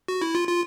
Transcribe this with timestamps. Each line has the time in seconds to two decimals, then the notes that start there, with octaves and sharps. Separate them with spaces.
0.08 F#4
0.22 E4
0.35 F4
0.48 F4